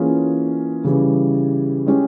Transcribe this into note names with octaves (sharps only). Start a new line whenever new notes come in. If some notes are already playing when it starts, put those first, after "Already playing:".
Already playing: E3 A#3 C#4 F4 G#4
C#3 E3 G3
G#3 C#4 G4